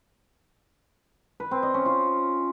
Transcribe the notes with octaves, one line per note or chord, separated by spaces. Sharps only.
B4
C4
D#5
C#4
F4